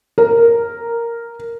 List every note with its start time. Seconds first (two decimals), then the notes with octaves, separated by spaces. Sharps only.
0.18 A#4